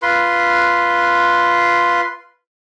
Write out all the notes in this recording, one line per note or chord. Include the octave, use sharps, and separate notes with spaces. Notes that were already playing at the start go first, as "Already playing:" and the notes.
F4 B4 C6